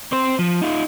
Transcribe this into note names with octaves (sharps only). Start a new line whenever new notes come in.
C4 C5
F3
D#4 F4